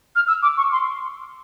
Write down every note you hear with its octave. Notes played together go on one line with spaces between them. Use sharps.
F6
E6
D6
C#6
C6